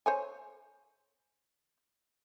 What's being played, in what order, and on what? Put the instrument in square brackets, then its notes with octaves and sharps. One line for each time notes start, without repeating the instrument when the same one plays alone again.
[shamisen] C5 C#5 G#5